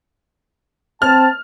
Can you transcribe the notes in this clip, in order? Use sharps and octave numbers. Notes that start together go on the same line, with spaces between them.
C4 A5 F6